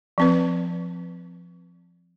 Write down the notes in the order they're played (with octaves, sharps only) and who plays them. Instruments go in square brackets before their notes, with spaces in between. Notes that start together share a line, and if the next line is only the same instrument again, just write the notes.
[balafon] F3 C4 B4